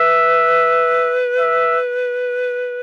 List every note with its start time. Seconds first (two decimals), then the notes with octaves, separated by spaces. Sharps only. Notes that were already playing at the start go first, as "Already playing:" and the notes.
Already playing: B4 E5
1.39 E5